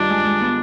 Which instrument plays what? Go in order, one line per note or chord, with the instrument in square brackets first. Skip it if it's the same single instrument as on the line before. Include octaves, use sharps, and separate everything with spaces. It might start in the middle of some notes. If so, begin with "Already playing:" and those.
Already playing: [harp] G2 D#3 F4 [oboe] D4
[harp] G#3
G#3
B3